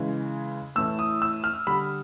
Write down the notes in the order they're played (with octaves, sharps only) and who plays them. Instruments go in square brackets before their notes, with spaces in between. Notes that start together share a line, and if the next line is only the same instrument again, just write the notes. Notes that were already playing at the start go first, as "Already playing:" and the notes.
Already playing: [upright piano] C#3 E3 G#3
A2 E3 A3 E6
D#6
E6
F6
D3 G3 B5